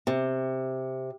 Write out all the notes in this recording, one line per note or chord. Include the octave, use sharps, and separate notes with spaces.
C3